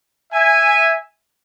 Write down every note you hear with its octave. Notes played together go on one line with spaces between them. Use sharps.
E5 G#5